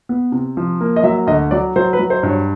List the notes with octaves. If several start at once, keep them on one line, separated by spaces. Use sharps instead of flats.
B3
C3
F3
A#3
D#5
F#3 E5
D2 D#5
F#3 D5
F#3 C5
B4
F#3
C5
G2
C#5